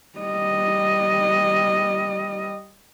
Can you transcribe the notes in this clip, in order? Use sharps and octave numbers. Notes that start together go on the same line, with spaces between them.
G3 D#5